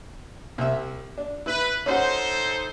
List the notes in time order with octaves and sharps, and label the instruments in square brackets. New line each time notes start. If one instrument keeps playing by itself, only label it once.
[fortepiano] C2 E5
D4
[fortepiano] E4 [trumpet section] B4
[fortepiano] C#4 F#4 [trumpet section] D#4 A4 C5